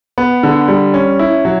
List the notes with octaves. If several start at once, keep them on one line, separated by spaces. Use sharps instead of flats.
B3
D3
G3
C#4
E4
F#3